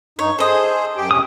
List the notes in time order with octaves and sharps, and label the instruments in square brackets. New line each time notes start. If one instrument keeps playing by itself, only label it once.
[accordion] G2 D#4 [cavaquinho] C#5
[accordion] G#4 C5 [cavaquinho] A4 D#5
[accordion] F#2 G4 G5
[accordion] F2 C3 C#4 [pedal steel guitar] D#6